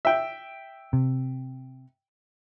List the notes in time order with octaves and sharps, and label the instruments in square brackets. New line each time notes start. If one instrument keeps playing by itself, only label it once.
[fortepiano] E5 G5
[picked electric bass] C3